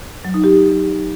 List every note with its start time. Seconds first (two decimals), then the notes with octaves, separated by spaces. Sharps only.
0.25 F#3
0.34 D#4
0.44 G4